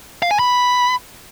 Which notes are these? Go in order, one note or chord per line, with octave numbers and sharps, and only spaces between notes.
F5
G#5
B5